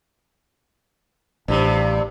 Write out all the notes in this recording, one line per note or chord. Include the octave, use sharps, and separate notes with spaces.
A1 G2 C3